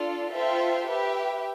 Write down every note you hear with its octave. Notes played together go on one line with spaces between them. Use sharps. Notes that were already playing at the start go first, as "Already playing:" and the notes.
Already playing: D4 F4 A4
F4 A4 C5 E5 G5
G4 B4 E5 G5